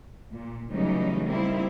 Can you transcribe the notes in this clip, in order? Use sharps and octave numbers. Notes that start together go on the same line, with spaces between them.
A#2
C#3 E3 F#3 G3 A3 D#4
G3 A#3 C4 D#4 E4